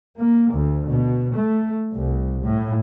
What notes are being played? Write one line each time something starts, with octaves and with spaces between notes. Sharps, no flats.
A#3
D2
B2
A3
C2
A2